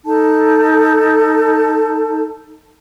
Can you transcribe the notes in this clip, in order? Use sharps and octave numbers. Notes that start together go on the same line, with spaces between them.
D#4 A4 A5